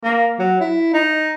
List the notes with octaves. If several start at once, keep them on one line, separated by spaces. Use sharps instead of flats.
A#3
F#3
E4
D#4